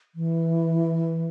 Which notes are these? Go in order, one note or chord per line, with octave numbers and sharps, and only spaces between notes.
E3